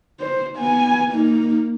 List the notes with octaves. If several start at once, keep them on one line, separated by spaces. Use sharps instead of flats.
C5
B3 G#5
A#3 D#4